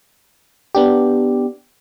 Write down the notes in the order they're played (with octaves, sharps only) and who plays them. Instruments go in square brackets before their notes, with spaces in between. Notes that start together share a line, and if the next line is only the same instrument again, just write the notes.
[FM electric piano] B3 D4 G4